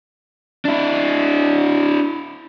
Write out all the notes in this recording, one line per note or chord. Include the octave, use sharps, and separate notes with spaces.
D4 E4